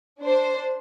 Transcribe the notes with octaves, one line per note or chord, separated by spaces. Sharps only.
D4 C5